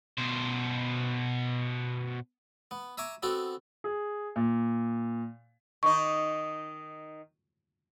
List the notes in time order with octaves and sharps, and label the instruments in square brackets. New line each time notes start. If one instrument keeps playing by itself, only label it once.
[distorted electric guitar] B2 C5
[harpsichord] B3
E5 G#5 A#5 C#6 D6
B3 C4 F#4 A4
[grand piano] G#4
A#2
[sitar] D#3 D#4 [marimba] C#6